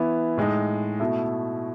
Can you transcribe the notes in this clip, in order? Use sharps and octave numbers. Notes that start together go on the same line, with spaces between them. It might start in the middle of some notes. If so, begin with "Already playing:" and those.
Already playing: E3 B3 E4
A2 G#3 D#4
B2 A3 E4